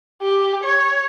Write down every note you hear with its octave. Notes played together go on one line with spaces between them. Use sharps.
G4
C#5